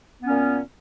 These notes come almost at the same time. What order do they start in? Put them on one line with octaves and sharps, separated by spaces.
B3 C#4 A#2